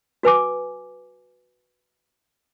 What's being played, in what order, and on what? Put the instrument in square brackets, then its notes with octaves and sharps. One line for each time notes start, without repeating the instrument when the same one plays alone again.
[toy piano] F#4 B4 G#5 D6